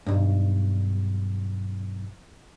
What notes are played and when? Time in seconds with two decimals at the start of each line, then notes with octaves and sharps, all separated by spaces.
0.06 B1 G2